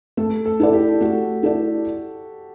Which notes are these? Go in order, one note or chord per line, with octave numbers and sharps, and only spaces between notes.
A3 A4
A4
E4 A4 D5
G4
A3 F#4
E4 A4 D5